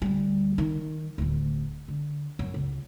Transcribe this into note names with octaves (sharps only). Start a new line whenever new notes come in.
D2 G3
D#3
D1 D2
D3
F#2
C#2